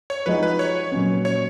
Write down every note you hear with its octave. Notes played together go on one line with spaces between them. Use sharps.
C#5
F3 G#3 D#4 F#4 B4
B4
C#5
A#2 F#3 C#4
C#5